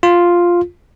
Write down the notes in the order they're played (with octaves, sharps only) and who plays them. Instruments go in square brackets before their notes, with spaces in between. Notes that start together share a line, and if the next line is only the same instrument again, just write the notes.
[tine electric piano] F4